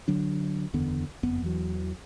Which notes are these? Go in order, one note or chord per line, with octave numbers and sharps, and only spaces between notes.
D3 F#3 D4
F#1 E2 D3 B3
F#1 F2 B3
E2 E3 F#3